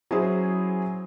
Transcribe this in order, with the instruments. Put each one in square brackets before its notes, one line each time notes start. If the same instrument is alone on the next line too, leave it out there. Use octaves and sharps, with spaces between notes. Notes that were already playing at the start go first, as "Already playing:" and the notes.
[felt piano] F#3 C#4 E4 G#4 C5